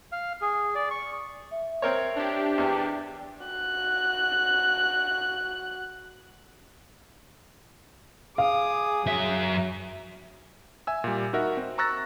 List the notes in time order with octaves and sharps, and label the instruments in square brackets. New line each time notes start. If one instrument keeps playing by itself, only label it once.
[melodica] F5
G#4
D5
C#6
[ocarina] E5
[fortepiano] C4 A#4 C#5
[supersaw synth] D4 G4
[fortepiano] E2 [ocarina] G5
[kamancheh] F#4 F#6
[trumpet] G#4 [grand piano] F5 [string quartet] D6 D#6
[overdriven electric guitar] F#2 E5 [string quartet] F#3
[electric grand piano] E5 G#5 E6
A#2 G3
D#4 F#4 A#4 E5 F#5
C4
A#5 C#6 E6 F#6 A6 A#6